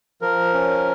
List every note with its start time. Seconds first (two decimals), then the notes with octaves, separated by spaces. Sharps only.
0.22 F3 A#4
0.54 C#4